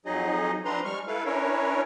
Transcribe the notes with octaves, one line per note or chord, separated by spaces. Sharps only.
F2 F#3 D#4 G#4 D#5
F3 C4 D4 B4 A#5 C6
G3 G#3 C#6 F6
E4 A4 B4 F5
C#4 D4 E4 A#4 B4 C#5